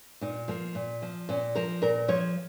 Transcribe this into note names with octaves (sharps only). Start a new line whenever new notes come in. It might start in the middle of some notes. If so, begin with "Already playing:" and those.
A#2 D#4
F3 A#3
A#2
F3
A#2 C#4
F3 A#4
A#2 A#4
F3 C#5